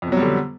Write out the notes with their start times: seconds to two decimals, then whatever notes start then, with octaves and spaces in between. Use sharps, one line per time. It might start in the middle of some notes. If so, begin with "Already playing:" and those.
0.02 F2
0.07 B2
0.12 F#3
0.17 G3
0.22 D3